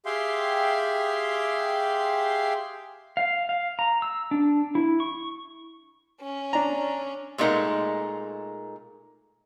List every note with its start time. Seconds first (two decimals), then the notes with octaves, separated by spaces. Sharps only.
0.06 G4 G#4 E5 F5 G5 C6
3.17 F5
3.49 F5
3.79 A#5
4.02 E6
4.31 D4
4.75 E4
5.00 C#6
6.21 C#4
6.53 D4 A#5
7.38 A#2 G#3 A3 D#4 A#4 F#5